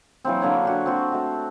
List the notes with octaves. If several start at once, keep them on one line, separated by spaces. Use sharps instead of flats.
E3 F#3 A#3 C4
D3 A#3 C#5 F#5
F#4 G4
C4 F#4 A5
A3 F#4